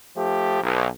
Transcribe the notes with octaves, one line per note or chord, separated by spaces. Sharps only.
F3 A3 G4
B1